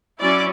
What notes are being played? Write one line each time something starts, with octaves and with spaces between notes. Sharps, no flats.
F#3 C#4 E4 D5